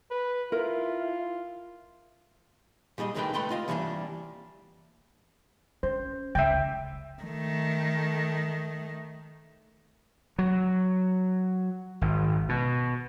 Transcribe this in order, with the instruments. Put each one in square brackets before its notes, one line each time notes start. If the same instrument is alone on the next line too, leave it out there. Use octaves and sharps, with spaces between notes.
[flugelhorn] B4
[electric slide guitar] E4 [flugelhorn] F4 [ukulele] A#4
[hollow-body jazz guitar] A#2 G3 G#4 D#5
D2 D#3 G#3 A3 B4 G5
C#2 A3 B4 G5 C6
F4 D#5 F5
D3 E3 G3 A3 A#3 D4
[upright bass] C#4 [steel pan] C5
[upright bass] C#2 C#3 [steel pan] E5 G5
[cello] D#3 A3
[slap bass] F#3
G#1
B2